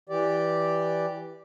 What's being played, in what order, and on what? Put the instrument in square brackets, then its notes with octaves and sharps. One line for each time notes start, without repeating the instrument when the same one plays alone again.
[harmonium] E3 G4 D5